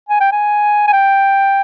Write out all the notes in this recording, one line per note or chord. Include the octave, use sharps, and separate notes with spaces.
G#5
G5
G#5
G#5
G5